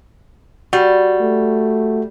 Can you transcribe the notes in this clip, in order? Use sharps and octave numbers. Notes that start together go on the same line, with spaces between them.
G3 F#4
A3